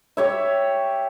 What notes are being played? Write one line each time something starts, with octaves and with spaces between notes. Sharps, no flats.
G4 C#5 E5